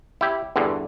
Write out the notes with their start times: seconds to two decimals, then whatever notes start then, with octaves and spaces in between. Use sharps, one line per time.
0.21 E4 G4
0.56 E2 G2 D3